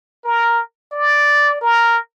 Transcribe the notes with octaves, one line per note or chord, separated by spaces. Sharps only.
A#4
D5
A#4